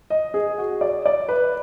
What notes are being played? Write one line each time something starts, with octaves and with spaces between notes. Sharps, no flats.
D#5
G#4
F#4
D5
D5
B4